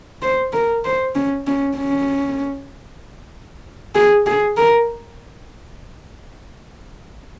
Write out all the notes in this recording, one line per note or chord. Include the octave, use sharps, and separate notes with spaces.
C5
A#4
C5
C#4
C#4
C#4
G#4
G#4
A#4